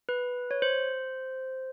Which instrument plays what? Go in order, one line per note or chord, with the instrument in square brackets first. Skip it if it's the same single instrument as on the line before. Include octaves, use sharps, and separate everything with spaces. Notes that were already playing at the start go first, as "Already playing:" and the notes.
[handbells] B4
C#5
C5